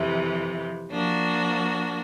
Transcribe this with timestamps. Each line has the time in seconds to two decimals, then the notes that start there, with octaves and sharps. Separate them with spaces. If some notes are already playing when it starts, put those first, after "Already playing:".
Already playing: F2 C3 E3
0.91 F3 A#3 D4 F#4